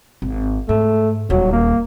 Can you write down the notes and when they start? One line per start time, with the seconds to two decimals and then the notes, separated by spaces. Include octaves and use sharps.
0.22 G#1
0.69 G#2 A3
1.30 D#1 D#2 F#3
1.52 A#3